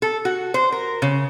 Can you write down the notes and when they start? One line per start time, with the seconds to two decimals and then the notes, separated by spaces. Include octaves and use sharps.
0.02 A4
0.25 F#4
0.54 C5
0.72 A#4
1.02 C#3